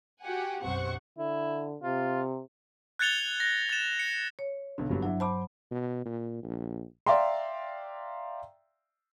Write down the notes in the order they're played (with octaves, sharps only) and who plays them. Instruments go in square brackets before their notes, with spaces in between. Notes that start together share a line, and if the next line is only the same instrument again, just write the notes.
[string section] F#4 G4 F#5 G#5
B1 F#2 C3 C5 F#5 C#6
[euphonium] D3 [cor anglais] E4
[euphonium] C3 [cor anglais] F4
[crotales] F#6 G#6 A6 C#7 F7 G7
A#6
A6 E7
C#7
[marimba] C#5
[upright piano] B1 D3
[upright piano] G1 F#3 G3 [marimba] G2
[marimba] F#3 [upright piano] D4 E4
[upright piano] C5 D6 [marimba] A5 B5
[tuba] B2
A#2
A#1
[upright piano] D5 E5 F5 G5 A#5 C6